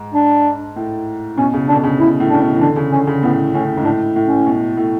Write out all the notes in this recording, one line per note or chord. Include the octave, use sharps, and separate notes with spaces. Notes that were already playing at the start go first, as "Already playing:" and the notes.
Already playing: G#2
D4
A2
B2 C#4
C#3
D3 D4
B2
C#3
B2 E4
A2
C#3 D4
B2
E3
D3 D4
C#3
D3 C#4
C#3
A2 B3
A2 C#4
G#2
A2 D4
A2
C#4
B2
A2